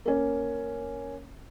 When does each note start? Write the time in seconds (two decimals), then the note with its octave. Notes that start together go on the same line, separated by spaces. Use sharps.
0.06 A#3 C#4